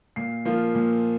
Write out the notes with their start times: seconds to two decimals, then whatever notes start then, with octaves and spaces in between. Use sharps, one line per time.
0.16 A#2 C7
0.45 F3 A#3 F4
0.75 A#2